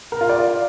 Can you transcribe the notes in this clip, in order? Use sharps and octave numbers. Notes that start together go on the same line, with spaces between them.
A#4
F4
D5
F4